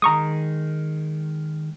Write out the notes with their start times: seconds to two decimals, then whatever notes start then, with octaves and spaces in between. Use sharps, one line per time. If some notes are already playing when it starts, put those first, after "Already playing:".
0.02 D#3 G#3 A#5 C#6 D#6